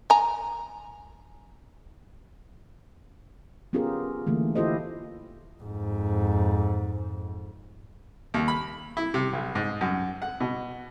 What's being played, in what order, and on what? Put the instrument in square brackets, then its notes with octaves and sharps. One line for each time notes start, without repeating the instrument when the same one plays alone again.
[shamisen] G#5 A#5
[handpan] B3 C#4 F4 G4 G#4 A#4
D3 E3 A3 A#3
E4 F4 G4 A4 C5 D#5
[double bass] F2 G#2
[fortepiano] D#2
B5
E4
C3
B1
G#2
F#2
F#5
B2